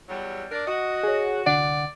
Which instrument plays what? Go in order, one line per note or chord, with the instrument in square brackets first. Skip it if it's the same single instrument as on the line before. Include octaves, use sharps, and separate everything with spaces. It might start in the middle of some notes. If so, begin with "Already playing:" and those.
[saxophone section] E2 F#3 G3
D4 A#4 D5
[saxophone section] F#4 [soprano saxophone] D#5
[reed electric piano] G#4 C#5
[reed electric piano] C2 D3 F#5 [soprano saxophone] D5